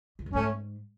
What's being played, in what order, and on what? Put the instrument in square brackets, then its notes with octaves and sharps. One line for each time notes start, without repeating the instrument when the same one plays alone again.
[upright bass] E2
F#2
[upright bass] G#2 [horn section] A3 C#4